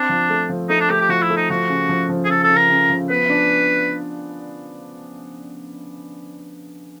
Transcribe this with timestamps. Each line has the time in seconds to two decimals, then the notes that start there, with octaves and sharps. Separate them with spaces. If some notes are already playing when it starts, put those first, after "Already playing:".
Already playing: C4 D4
0.09 F3
0.30 A3
0.49 F3
0.69 A3 D#4
0.80 D4
0.90 A3 G4
1.00 G4
1.09 F3 F#4
1.22 E4
1.30 A3
1.36 D#4
1.50 F3 F#4
1.69 C#3
1.89 F3
2.10 F3
2.25 G#4
2.30 C#3 A4
2.44 A4
2.49 C#3
2.56 A#4
2.69 C#3
2.90 F3
3.10 B3 B4
3.30 D4